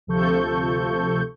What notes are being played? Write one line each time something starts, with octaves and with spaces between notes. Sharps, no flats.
D2 C3 F3 A4 C#6 G6